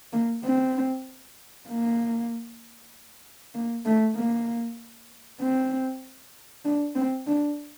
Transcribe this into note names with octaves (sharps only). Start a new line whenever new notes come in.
A#3
C4
A#3
A#3
A3
A#3
C4
D4
C4
D4